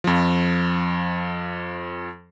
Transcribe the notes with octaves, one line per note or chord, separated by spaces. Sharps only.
F2 F3